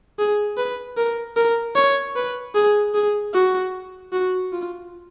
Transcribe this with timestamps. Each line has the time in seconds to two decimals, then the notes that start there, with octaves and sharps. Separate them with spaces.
0.19 G#4
0.57 B4
0.97 A#4
1.36 A#4
1.76 C#5
2.16 B4
2.55 G#4
2.94 G#4
3.34 F#4
4.12 F#4
4.52 F4